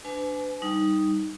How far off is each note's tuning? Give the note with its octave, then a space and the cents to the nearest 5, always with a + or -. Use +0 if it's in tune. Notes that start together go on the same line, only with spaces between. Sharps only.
D4 +0 B4 +40 G#5 +40
G3 +0 D#4 +0